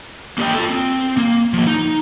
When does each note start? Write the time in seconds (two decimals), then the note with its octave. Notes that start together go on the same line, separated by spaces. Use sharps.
0.38 A#3 G4 G#4 D5 D#5 G5
0.54 F4 A4
0.69 C4
1.17 A#3
1.53 F3 A#3
1.67 D#4